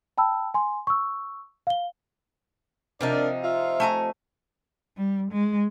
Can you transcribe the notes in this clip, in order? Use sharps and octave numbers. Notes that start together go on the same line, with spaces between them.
G5 A5 B5 E6
G#5 C6
C#6 E6
F5 G7
C3 F3 D4 D#4 A#4 D5
F4 E5 F5
A3 G#5 A#5
G3
G#3